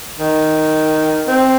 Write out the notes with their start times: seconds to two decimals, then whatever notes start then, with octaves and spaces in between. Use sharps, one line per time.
0.19 D#3
1.28 C4